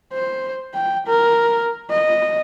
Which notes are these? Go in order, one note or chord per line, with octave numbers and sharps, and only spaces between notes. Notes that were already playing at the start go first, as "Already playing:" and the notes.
C5
G5
A#4
D#5